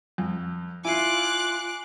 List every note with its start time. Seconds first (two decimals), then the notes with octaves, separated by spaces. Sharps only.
0.18 F2
0.85 E4 F4 G#5 D6 F#6 C7